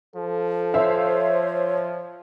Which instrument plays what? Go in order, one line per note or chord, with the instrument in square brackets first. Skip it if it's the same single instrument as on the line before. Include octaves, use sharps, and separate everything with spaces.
[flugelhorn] F3 [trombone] A4
[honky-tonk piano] C5 E5 F5 [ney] C#5